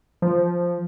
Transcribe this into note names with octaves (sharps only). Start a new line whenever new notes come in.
F3